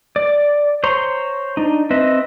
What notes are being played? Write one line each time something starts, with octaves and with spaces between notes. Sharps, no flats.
D5
C5 C#5 A#5 C6
D4 D#4
C4 B4 D#5 E5